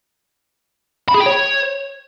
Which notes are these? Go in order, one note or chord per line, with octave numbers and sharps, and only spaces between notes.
B5
G#4
G5
C#5